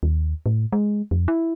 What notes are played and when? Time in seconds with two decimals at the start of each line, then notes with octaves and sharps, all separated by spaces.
0.03 D#2
0.46 A2
0.72 G#3
1.11 F2
1.28 E4